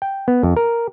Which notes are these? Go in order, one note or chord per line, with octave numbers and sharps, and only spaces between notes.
G5
B3
F2
A#4